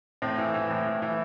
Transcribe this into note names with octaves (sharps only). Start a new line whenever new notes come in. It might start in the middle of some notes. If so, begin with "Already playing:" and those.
A2 C4
E3
E3
A2
A2
E3